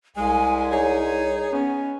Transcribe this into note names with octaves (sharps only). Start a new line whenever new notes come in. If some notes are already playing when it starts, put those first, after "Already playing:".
C2 G#3 G#5
D#4 G#4 C#5
B3 C#4